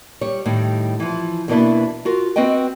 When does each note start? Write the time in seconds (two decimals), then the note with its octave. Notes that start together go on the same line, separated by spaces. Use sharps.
0.21 G3 C#5
0.46 A2 D#3 G3
1.00 E3 F3
1.48 E2 B2 E3 A#3 D4 E4
2.05 F4 F#4 A#4
2.36 C4 F#4 B4 D#5 G5